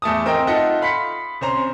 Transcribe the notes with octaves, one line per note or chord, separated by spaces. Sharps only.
E2 A3 A5 D#6
C4 A#4 D#5 G5
D#4 F4 A4 D#5 E5 F#5
F5 B5 C6 B6 C#7
C2 C#4 C5 A#5